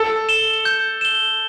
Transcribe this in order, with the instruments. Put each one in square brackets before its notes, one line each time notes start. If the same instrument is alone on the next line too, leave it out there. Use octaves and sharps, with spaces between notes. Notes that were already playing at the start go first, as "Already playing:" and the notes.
Already playing: [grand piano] A4
[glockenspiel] E7 G7
G6
E7 G7